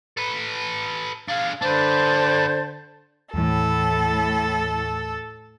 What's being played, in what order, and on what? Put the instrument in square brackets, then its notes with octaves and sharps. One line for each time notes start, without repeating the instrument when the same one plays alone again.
[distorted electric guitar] A4 B4
[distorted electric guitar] D4 G#4 [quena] F5
[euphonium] D3 [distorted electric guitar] D4 B4 [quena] C5 [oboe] A5
[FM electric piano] D#2 E3 [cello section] A2 [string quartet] A4